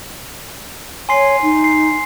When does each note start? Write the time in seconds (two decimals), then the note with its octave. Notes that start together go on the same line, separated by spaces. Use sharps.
1.09 C#5 G#5 C6 C7
1.42 D#4
1.64 C7